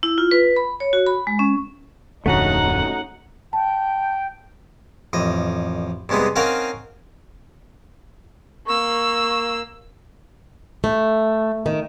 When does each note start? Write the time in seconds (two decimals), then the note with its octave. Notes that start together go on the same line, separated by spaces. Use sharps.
0.03 E4
0.18 F4
0.31 B4
0.56 B5
0.80 C#5
0.93 F#4
1.06 B5
1.27 G#3
1.39 C#4
2.26 D1 F2 D3 A3 C#4 D#4 F#4 F#5
3.53 G5 A5
5.13 A1 F2 D#5
6.09 G2 C3 G#3 B3 D#4
6.36 C4 C#4 D#4 A#4 F5 F#5
8.66 A#3 C#6 E6
10.84 A3
11.66 D#3